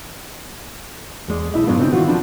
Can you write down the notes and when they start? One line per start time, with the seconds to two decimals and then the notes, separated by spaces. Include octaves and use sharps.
1.28 E2 G#3 D5
1.54 B1 E4 D#5
1.67 G2 F#3 G#3 B3 D4 F4
1.79 C#3 C4 D4 D#4
1.93 D#3 E3 D4 F4 F#4
2.08 F3 D4 B4